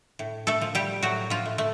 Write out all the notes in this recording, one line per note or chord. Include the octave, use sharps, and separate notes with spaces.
A2
A3 A4
F3
G3 G4
A2 F#3 F#4
F3 F4
A3
A3